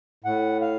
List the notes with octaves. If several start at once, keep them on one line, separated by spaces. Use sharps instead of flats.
A2 F#5
F5